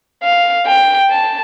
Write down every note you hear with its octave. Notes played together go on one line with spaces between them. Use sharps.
F5
G5
A5